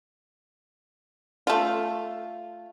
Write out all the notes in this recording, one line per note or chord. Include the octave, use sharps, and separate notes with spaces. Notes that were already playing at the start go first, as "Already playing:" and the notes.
A3 F4